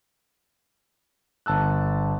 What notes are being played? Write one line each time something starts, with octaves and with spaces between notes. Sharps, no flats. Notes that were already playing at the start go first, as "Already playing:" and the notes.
G1 A5 E6 F#6